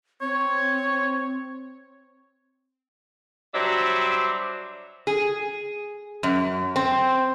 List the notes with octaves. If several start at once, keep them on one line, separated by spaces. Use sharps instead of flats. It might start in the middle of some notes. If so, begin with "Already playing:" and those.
C4 C#5
F#3 G3 D4 C5 E5
G#4
F#2
C4